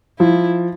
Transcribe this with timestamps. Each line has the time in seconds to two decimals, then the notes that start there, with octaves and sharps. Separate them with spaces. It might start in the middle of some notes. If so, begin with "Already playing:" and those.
0.19 F3 E4